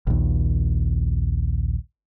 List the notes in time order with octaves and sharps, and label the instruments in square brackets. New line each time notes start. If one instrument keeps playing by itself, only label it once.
[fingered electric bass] A#1 D#2